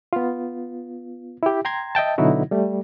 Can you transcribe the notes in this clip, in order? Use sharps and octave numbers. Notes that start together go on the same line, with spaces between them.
B3 F4
E4 G4
G5 A#5 C6 G#6
D#5 E5 G5 A5
B2 D3 F#3 D#4 E4 F#4
G3 A3